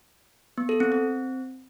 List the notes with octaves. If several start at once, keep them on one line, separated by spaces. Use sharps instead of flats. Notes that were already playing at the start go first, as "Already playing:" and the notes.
B3
A4
C4
C4